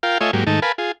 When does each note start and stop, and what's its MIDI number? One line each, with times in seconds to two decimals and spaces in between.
0.03 0.18 65
0.03 0.18 70
0.03 0.18 77
0.03 0.18 79
0.21 0.31 57
0.21 0.31 65
0.21 0.31 73
0.21 0.31 75
0.21 0.31 76
0.21 0.31 80
0.33 0.44 44
0.33 0.44 54
0.33 0.44 58
0.33 0.44 67
0.47 0.60 44
0.47 0.60 51
0.47 0.60 57
0.47 0.60 63
0.47 0.60 81
0.62 0.72 70
0.62 0.72 71
0.62 0.72 77
0.62 0.72 80
0.62 0.72 81
0.62 0.72 83
0.78 0.92 65
0.78 0.92 68